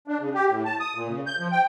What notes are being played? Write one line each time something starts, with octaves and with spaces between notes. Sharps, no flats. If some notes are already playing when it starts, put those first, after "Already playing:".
D4
C#3
G4
A2
A5
D#6
A#2
C#3
G6
F3
G5